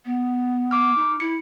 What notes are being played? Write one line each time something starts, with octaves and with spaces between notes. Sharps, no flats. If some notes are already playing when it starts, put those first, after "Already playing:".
B3
D6 F6
D#4
E4 C#7